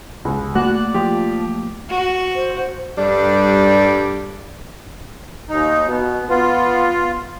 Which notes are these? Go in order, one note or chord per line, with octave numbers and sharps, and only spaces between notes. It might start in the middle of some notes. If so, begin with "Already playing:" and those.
C#2
A3 A#3 F#4 D5 F#6
F3 G4
F#4
C5
G2 G3 D4 A4 D5
D#2 D#4
B2 B3
B3 F4